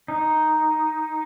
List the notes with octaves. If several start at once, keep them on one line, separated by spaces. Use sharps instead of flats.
D#4